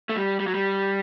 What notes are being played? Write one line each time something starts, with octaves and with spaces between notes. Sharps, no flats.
A3
G3
G3
F#3
G3